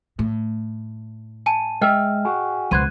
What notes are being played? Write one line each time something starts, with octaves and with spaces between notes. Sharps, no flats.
A2
G#5 A5 D#7
G#3 D#5 E5 G5 F6
F#4 G#4
C#2 B2 F3 B3 C5 F#6 G#6 D#7